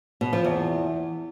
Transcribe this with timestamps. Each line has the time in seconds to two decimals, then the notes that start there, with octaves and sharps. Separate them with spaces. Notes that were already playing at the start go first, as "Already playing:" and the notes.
0.21 B2
0.33 F3
0.44 E2